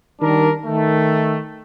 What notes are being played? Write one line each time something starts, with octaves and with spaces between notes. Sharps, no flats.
D#3 G3 D4 A#4
D#3 A3